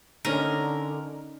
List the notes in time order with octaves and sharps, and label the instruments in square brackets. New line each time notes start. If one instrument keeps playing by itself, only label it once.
[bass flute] D3 [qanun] C#4 D#4 D#5 [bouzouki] A#4